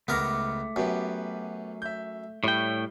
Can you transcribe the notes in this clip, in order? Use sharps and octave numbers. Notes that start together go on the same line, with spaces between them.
C#2 A3 B3 A#4 D6 A#6
F#2 B3 G4 B4
E5 G6
A2 G3 E4 C#5 G5 C#6